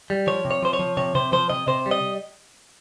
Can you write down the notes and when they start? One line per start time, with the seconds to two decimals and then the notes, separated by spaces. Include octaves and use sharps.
0.10 G3
0.27 F3 C#5
0.45 C3
0.51 C#5
0.62 F3 C5
0.73 C#5
0.79 F3
0.97 C3 C#5
1.15 C3 C5
1.32 F3 C5
1.50 C3 D#5
1.67 C3 C5
1.86 G3
1.91 D#5